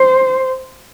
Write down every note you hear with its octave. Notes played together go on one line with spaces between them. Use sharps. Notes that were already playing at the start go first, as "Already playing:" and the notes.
Already playing: C5